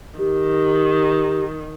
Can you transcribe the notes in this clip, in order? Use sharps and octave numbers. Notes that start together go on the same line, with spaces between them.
D#3 G4